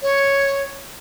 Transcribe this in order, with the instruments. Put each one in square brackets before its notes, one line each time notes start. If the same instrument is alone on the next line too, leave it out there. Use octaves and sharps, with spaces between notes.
[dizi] C#5